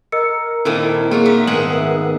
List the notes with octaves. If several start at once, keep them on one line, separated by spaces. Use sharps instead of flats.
A#4 D#5 E6 C#7
A#2 D#3 A#3 C4 E4 A4
F#3 A#3 F4 F#4 G#4
D#4 E5
G#2 D#3 A3 B3 G#4 F#5 F#7
E5